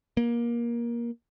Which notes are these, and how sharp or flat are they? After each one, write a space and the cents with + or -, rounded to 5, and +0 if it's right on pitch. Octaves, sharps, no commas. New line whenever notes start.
A#3 +20